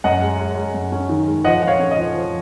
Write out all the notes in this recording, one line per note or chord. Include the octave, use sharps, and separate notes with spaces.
F#2 D#5 F#5
G#3
G#3
G#3
F#2
C#4
D#3
G#3
F3 D#5 F#5
F3 F#5
C#5 F5
C#4
D#5
F3
F3